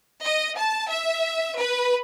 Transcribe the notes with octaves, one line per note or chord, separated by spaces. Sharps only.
D#5
A5
E5
B4